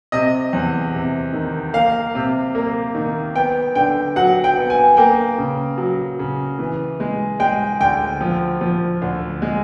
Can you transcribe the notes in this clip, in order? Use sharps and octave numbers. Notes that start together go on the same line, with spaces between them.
C3 D#5
E2
C3
D#3
A#3 F5
C3
A#3
D#3
B3 G5
D3 G5
F#3 F#5
G5
B3
G#5
A#3 G5
C#3
F#3
C#3
E3
G#3
G#3 G5
D2 G5
F3
F3
D2
G#3